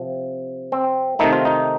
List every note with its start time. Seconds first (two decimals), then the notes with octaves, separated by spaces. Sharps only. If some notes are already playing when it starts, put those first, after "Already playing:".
Already playing: C3 F3
0.72 C4
1.19 C3 D#3 A3 D#4
1.33 F4
1.45 D#4